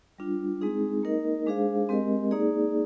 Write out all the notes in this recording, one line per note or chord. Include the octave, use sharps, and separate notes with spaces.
G3 D4 F4
G#3 C4 D#4 G#4
A#3 D#4 A#4 D#5
G#3 D4 G#4 C5 F5
G#3 C4 G4 A#4 D#5
A#3 D#4 G#4 D5